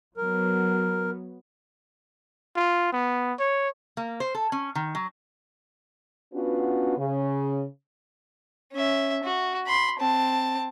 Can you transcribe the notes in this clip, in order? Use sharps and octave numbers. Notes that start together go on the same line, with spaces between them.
F#3 B3 A#4
F4
B3
C#5
A#3
C5
A4
C#4
D#3
F#3
B3 C#4 D4 F4 F#4 B4
C#3
C#4 E5
F#4
B5 C6
C4 A5